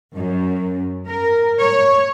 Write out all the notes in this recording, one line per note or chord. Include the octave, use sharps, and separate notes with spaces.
F#2
A#4
C#5